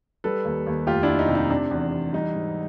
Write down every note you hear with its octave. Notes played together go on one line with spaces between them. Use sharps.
G3 A4 B4
D#2
D#2
F1 F4 G4
D4 E4
F1
D#4
C3
D#4
C3 D4
E2
E2
G3 D#4
G#2